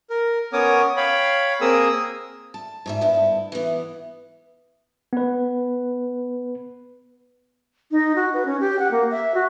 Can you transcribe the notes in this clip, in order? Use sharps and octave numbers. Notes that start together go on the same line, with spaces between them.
A#4
B3 C#4 A#4 C#5 D6 D#6
C#5 F5 G5 B5
A#3 C4 G#4 A#4 D#6 E6
A5
G#2 C#5 E5
D2 G2 B3 E4
E3 B3
B3 B4
D#4
F#4
B4
C#4
G4
F#5
A#3
E5
F#4